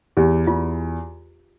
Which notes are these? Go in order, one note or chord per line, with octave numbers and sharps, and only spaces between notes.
E2 G4
E2 F4